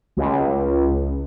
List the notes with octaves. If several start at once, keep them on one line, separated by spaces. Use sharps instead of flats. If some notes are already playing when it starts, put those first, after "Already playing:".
C#2